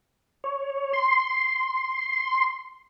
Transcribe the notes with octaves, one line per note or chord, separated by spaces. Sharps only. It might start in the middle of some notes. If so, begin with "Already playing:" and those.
C#5
C6